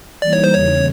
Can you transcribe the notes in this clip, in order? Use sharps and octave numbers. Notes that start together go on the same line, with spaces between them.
E3 G3 A#3 D#4 D5
C#5
C5
E2 C#3 E3 C#5